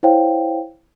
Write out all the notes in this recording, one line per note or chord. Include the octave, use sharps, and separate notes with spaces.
E4 C5 C#5 F5 G5